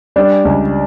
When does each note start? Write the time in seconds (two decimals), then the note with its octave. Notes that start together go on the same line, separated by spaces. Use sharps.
0.16 G3 D4 D5
0.45 C#2